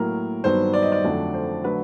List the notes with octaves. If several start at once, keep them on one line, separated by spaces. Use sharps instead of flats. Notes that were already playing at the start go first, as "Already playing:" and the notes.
Already playing: A2 F#3 A#3 A#4
G2 D#3 F#3 B3 C5
D5
D#5
D5
F2 D3 F#3 A3
C5
D3 F#3 A3 B4